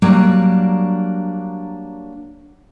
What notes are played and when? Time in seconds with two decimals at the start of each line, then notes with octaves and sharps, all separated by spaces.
0.02 F#3 G3 A#3 D4